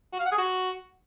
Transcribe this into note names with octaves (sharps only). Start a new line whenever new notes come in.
F#4
F5
F#5
G#4
F#4